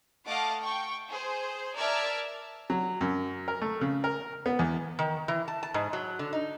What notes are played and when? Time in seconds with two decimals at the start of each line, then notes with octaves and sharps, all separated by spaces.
0.27 A3 D#5 F5 F#5 A5 D6
0.60 G5 C#6
1.09 G#4 C5
1.77 A#4 D5 E5 A5 F6 G#6
2.70 F#3
3.01 F#2
3.48 A#4
3.62 A3
3.81 C#3
4.04 A#4
4.46 B3
4.59 E2
4.99 D#3
5.28 E3
5.48 A5
5.63 A5
5.74 G#2
5.93 F#3
6.19 D3
6.33 D#4